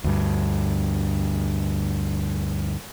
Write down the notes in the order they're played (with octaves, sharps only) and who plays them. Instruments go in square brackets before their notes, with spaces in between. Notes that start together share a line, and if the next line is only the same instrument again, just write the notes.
[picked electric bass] D2 G2